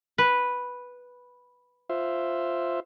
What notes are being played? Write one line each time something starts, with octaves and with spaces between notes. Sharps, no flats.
B4
F4 C5 E5